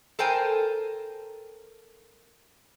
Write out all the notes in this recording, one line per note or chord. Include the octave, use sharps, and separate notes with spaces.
A4 A#4 C5 G5 G#5